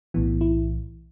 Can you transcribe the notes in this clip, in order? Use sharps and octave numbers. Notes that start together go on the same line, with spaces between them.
B1 A2 E3 B3
E4